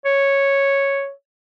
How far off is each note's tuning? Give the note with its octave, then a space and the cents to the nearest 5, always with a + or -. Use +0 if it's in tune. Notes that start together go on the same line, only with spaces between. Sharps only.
C#5 -5